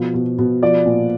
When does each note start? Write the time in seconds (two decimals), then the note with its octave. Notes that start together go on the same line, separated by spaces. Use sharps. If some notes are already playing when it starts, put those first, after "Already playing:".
Already playing: B2 F3
0.14 B2
0.39 B2
0.62 F3 D5
0.85 A#2